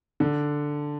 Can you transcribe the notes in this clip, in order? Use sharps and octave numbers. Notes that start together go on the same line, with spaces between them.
D3